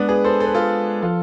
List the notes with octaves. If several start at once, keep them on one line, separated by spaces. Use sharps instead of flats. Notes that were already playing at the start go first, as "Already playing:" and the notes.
Already playing: G#3 B3 D4
G#4 B4
A4 C5
A4
B4
F4 A4
F3 F4 A4